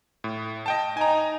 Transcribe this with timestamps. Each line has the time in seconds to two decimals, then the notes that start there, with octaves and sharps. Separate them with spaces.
0.24 A2
0.66 D#5 G5 A5
0.97 D#4 G#5 A#5